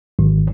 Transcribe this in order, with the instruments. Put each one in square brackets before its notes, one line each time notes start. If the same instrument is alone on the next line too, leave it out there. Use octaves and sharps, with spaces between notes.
[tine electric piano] G#1